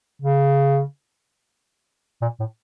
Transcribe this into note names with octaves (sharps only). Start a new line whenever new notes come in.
C#3
A#2
A2